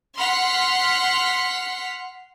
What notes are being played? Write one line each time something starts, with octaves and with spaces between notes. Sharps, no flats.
F#5 C6 F6 B6